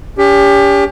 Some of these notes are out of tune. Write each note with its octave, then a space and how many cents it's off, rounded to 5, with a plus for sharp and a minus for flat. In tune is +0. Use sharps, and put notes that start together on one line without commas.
C#4 +45 G4 +30